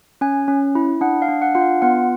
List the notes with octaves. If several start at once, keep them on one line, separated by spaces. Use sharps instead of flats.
C#4 G#5
C#4
E4
D4 F#5
F5
D4
F#5
F4 F#5
F5
B3 F#5